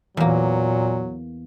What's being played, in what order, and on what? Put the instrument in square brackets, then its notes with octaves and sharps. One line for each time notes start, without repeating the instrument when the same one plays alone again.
[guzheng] E2 A#3 [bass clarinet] A#2 [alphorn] F#3